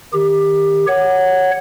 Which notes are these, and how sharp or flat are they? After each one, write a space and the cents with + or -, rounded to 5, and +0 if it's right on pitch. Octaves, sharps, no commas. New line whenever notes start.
D#3 +0 G4 +20
C#5 +0 F#5 +0